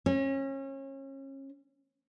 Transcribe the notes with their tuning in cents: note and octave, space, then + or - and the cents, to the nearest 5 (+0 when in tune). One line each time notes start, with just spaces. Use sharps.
C#4 -30